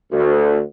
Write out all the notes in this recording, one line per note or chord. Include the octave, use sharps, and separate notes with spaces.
D2